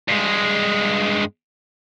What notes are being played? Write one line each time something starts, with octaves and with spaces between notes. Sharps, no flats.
G2 G#3